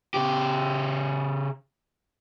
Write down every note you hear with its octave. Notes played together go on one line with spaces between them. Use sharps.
C#3 G4